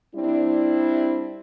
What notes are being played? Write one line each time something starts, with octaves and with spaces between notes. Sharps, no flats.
G3 C4 D4 E4